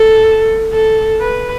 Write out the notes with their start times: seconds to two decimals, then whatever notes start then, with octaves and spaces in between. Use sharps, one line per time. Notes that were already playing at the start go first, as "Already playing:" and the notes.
Already playing: A4
0.73 A4
1.20 B4